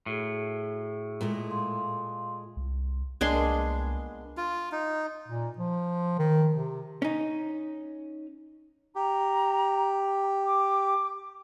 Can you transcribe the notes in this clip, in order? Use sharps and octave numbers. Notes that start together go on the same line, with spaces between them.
A2 F#4 G#4
A#2 G#3 A3
F5 C6
C2
C2 A#2 G#3 B3 D4 C6
F4
D#4
A#2
F3
D#3
C3
C#4 D#4
G4 A#5
D6